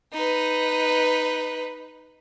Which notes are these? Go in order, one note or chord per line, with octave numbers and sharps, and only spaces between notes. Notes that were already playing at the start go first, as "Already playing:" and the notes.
D#4 B4